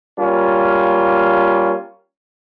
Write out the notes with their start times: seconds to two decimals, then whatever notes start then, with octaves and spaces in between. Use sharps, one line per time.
0.19 G3 A#3 C#4 F4